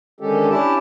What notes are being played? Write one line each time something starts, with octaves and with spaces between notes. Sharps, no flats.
D3 D#3 G#3 C#4 G4 A4
C#4 D4 E4 G4 A5